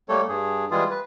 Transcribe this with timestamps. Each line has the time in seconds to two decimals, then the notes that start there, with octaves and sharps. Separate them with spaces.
0.09 G3 A3 A#3 A4 C#5
0.29 G2 G#4
0.71 E3 G3 G#3 F4 G#4
0.90 B4